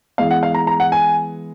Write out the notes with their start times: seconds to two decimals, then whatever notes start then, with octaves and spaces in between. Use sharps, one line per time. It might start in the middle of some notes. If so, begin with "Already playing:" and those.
0.18 E3 G#3 B3 F5
0.31 F#5
0.43 F5
0.54 A#5
0.67 A#5
0.80 F#5
0.92 G#5